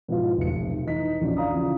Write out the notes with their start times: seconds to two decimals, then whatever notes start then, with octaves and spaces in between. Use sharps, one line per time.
0.08 G#2 B2 F3 B3 E4 F4
0.38 F1 B1 C#7
0.86 E3 D#4 B6
1.21 A#1 E2 D3 C#4 F#4 D5
1.37 D5 F5 A#5 D#6
1.52 C#3 F3 E4